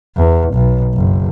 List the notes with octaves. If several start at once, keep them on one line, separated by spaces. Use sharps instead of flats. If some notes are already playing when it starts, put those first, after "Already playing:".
E2
B1
F#1